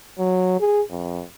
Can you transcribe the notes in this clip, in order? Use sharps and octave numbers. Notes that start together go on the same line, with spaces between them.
F#3
G#4
F2